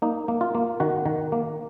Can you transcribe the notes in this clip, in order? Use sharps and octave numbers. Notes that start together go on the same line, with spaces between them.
A#3 D#4
A#3
F4
A#3
D#3 F#4
D#3
A#3